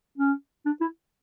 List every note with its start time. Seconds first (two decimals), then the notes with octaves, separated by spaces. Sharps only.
0.18 C#4
0.65 D4
0.81 E4